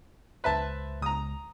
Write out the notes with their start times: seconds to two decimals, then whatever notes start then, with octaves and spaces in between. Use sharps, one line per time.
0.44 C#2 B4 C5 E5 A5
1.02 C#2 A#5 D#6